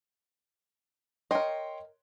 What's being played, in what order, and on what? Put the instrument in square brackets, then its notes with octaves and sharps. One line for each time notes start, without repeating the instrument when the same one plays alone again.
[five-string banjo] A#4 D#5 [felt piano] C#5 G5 C6